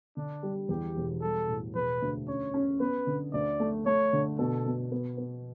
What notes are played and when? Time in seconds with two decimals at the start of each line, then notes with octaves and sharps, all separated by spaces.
0.17 D3 D4
0.43 G3
0.69 E2 G4
0.96 E1
1.21 G3 A4
1.48 A2
1.75 E1 B4
2.02 D2
2.27 C#4 C#5
2.54 C#4
2.80 B3 B4
3.07 D3
3.33 D2 D5
3.60 A3
3.86 A3 C#5
4.13 D3
4.39 B2 A4
4.66 B2
4.92 B3
5.18 B3